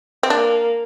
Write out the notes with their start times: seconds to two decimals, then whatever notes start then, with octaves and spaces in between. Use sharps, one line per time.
0.23 C4
0.30 A#3 D4